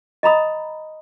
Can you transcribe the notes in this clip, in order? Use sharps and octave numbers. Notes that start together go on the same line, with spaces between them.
D#5 A#5 B5 D#6